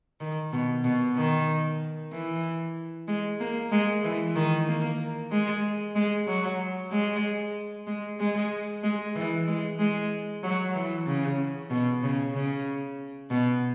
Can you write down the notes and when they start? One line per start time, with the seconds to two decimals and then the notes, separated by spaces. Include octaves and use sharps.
0.20 D#3
0.52 B2
0.84 B2
1.16 D#3
2.12 E3
3.08 G#3
3.40 A#3
3.72 G#3
4.04 E3
4.36 D#3
4.67 A#3
5.31 G#3
5.95 G#3
6.27 F#3
6.91 G#3
7.87 G#3
8.20 G#3
8.83 G#3
9.15 E3
9.47 G#3
9.79 G#3
10.43 F#3
10.75 E3
11.07 C#3
11.70 B2
12.03 C#3
12.34 C#3
13.30 B2